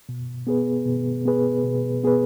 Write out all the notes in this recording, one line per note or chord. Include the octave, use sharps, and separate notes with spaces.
B2
B3 G#4 B4
B2
B3 G#4 B4
B2
B3 G#4 B4